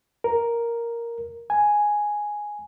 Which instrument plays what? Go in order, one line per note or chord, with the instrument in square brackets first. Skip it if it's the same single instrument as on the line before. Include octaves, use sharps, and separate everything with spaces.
[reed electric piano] A#4
G#5